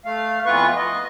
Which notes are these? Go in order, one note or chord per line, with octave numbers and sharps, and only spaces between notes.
A3 F5
F2 E3 B3 F4 B4 C#6
D#5